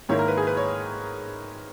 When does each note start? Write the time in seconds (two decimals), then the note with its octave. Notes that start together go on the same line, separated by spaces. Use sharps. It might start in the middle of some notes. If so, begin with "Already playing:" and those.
0.09 G#2 D#3 A#3 E4 C#5
0.19 A#4
0.28 B4
0.37 G#4
0.47 B4
0.57 C#5